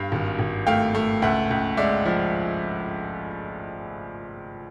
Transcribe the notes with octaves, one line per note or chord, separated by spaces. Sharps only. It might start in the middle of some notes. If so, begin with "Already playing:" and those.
Already playing: G2 F5
G#1
G#1
A3 F5 G5
A3
C#2 E5 F#5
C#2
G#3 D5 E5
F3